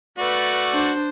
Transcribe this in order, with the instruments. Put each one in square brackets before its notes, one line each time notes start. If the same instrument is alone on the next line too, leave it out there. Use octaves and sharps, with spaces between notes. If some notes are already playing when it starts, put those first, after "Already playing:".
[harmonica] A3 F#4 D5 [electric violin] B4
[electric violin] D4 C5